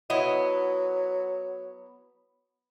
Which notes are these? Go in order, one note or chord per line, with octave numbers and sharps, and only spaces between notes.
F#3 B3 E4 D#5